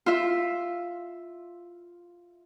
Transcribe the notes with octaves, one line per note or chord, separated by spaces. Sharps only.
F4 E5